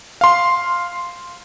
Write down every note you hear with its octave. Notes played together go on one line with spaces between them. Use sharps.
F5 C6